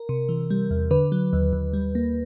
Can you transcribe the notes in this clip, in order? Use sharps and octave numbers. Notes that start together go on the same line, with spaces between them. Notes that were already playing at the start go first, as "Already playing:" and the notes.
Already playing: A#4
C3
E3
G3
E2
D3 B4
F#3
D#2
D#2
G3
A#3